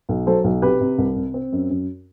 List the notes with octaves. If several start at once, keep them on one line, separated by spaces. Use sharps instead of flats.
B1
F#3 A4 C5
B1
C3 G4 B4
C3
C2
C3
C4
F#2
F#2